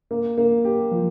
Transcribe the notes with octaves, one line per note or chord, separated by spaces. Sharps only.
A#3
A#3
G4
F3